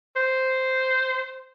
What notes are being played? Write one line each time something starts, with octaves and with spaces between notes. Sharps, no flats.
C5